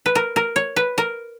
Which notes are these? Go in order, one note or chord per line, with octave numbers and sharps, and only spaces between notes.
B4
A#4
A#4
C#5
B4
A#4